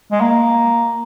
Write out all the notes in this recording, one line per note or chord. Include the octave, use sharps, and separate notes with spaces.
G#3
A#3